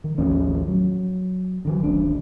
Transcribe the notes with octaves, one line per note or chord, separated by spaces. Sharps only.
D#3
A1 D#2 F3 C#4
F#3
D3 D#3 F#3
D1 A1 D4